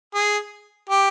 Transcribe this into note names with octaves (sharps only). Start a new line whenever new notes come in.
G#4
G4